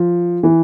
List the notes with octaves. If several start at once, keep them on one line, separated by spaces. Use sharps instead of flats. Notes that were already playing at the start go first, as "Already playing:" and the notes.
Already playing: F3
E3